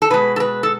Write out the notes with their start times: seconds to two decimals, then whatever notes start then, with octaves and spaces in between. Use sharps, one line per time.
0.02 A4
0.10 B2 G#3 B4
0.36 A4
0.40 B4
0.63 A4